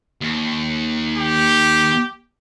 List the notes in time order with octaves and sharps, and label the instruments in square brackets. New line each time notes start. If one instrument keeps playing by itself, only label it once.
[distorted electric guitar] D#2
[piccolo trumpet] G4